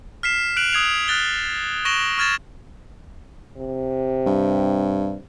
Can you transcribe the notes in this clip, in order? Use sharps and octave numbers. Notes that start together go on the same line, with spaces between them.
F6 B6 C7 E7
F#6 D7 F7 F#7
D#6 G#6 C7 F7
F6 F#6 A6 G7
C#6 A#6 D7 E7 F#7 G7
C#6 F6 G#6 A6 E7
C3
G2